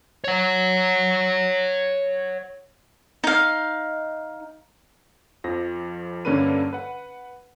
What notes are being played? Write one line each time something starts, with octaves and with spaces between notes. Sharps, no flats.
C#5 F#5
D#4 F5
F2 F3 A#6
G2 D3 A#3 C#4 B4 D#7
B4 F#5